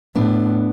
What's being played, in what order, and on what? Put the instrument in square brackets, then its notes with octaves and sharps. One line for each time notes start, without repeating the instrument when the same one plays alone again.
[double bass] A2 [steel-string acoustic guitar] B3 D4